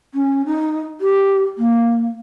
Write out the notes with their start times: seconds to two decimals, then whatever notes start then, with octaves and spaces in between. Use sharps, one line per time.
0.14 C#4
0.46 D#4
1.01 G4
1.58 A#3